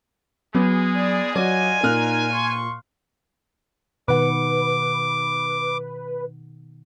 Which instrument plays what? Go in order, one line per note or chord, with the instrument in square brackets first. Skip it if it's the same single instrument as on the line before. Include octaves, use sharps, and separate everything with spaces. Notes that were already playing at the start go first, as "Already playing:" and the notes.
[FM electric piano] F#3 [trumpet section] G#3 G#4 [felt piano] B3
[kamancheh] D5
[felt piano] F#3 [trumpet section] F4 G#5 [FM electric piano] D5 [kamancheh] D#5 F#5
[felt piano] A#2 F6 F#6 [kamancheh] D#4 A#4
[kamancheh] C6 C#6
[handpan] B2 D#3 F#5 [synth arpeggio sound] B4 [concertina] D6